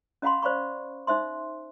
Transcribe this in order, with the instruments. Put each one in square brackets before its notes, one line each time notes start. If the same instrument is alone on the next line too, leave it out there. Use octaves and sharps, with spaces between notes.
[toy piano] C#4 D#5 F5 F#5 B5 C6
C5 D5 F5 B5 C#6
D#4 C5 E5 C6